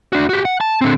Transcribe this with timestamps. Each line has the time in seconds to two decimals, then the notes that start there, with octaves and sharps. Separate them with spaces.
0.13 D4 F#4
0.29 F#4 G4
0.45 F#5
0.61 A5
0.81 D3 C4